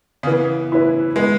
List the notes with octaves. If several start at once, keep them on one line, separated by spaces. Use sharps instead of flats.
C#3
E3 B3
E4 B4
G#3 B3